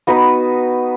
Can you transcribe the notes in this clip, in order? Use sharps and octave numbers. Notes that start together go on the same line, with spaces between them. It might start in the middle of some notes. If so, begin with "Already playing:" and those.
B3 D#4 F#4 B4